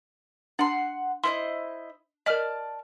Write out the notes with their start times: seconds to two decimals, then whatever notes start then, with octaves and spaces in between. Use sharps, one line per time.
0.59 D4 F#5 C6
1.24 E4 C5 D#5 C6
2.26 A#4 D5 D#5 A5 F6